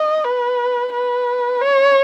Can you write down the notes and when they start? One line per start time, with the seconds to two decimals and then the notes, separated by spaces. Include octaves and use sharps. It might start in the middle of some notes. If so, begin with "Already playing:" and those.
Already playing: D#5
0.25 B4
0.93 B4
1.61 C#5